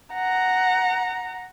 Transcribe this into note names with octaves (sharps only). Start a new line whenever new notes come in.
F#5 A#5